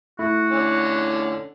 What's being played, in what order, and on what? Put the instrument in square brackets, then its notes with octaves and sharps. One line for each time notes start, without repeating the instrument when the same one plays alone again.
[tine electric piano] A3 E4 [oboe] F#4
[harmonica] D3 C#4